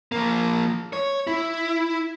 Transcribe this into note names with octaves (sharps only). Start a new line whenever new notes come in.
F3 A#3
C#5
E4